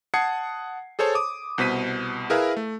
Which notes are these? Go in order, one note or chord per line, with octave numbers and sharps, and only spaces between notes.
F#5 A5 D#6 G#6 C7 C#7
G#4 A4 C5 C#5 A5
D6 D#6
C2 B2 C5 B6 D#7
E4 G#4 A#4 B4 E5 F5
A3